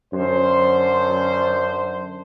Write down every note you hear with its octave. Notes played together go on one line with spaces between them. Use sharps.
F#2 D3 C5